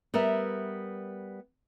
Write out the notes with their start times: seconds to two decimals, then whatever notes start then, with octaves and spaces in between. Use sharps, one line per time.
0.14 G3 B3 A#4 E5